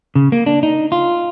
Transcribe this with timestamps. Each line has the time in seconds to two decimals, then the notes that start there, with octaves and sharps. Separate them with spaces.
0.15 C#3
0.32 A#3
0.46 D4
0.63 D#4
0.92 F4